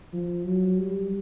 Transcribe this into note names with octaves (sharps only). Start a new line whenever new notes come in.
F3
F#3
G3